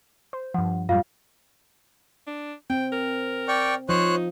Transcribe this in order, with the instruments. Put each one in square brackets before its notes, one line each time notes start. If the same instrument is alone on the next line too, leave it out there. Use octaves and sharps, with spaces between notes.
[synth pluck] C5
[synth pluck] G2 F3 [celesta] F#5
[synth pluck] F#2 A2 G3 [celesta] F4 F5
[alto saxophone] D4
[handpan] C4 [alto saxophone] G5
[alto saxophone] A#4
[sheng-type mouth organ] D5 G5 C#6
[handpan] F3 [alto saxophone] D#4 [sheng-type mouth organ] C5 C#5 F#6